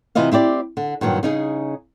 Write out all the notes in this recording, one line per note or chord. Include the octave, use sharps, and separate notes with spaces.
C3 E3 E4 F4 D#5 F5
C4 E4 G4 D5
D3
G2 A#2 D#3 F#3
C#3 D#4 G#4